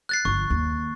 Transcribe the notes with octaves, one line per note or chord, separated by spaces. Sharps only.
F#6 A6 C7
G1 F3 C#6
D#2